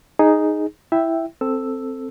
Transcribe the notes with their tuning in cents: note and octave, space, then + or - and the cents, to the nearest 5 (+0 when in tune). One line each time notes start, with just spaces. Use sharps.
D#4 +0 G#4 +0
E4 +0 E5 +0 G5 +0
C4 +0 A4 +10 E6 +0